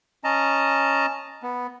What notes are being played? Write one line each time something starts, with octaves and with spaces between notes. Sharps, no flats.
C#4 D#5 A5 A#5
B3